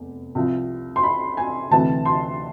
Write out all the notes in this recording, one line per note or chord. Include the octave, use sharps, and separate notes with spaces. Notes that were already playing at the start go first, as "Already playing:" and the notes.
Already playing: F1 E2
C2 C3 F3
C6
B5
G#5
D2 C3 E3 A5
C6